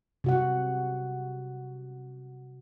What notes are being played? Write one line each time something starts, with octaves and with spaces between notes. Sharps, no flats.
C3 F#4 F#5